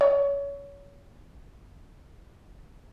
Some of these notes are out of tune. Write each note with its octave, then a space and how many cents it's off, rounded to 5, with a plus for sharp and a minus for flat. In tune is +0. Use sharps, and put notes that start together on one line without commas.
C#5 +25